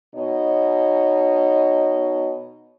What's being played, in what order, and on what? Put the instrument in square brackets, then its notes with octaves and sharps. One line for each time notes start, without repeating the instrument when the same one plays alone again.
[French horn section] B2 D#4 C#5 D#5